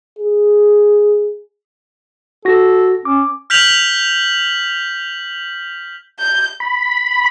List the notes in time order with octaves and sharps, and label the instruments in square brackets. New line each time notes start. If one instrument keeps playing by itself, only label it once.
[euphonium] G#4
[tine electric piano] F#4 A#6 [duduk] A4
[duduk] C#4 [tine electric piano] D6
[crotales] F6 G6 B6 F7 F#7
[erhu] G6
[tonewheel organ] B5